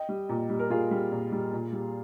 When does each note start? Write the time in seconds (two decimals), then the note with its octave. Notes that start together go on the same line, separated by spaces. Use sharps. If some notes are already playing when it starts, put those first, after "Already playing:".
Already playing: D#5 G5
0.09 G3
0.29 A#2
0.50 G3
0.59 A#4
0.70 A#2 F4 G#4
0.91 G3
1.12 A#2
1.32 G3
1.53 A#2
1.73 G3